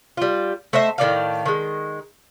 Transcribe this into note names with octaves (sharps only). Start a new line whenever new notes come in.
G3 F4
A3 C5 D#5 E5
A2 D#3 D5 F5
D#3 G#3